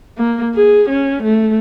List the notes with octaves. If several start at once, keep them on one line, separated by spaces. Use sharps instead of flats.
A#3
G#4
C#4
A3